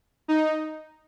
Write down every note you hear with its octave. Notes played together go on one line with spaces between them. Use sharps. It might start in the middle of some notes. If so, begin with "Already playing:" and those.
D#4